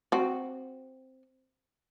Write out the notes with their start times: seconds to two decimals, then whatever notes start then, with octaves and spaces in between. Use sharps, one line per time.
0.12 C4 F#4